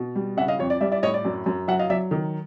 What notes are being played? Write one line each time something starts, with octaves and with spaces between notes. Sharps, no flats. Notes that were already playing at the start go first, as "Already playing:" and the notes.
Already playing: B2
G3
C#3 E5 F#5
D#5 F5
F2 C#5
D5
G3 D5 E5
D5 E5
A2 C#5 D#5
D5
F#2
F#2
F#3 E5 F#5
D#5 F5
F#3 D5 E5
D#3